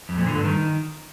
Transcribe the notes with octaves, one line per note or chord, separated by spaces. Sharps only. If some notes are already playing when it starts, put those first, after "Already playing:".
F2
A#2
D3
G2
D#3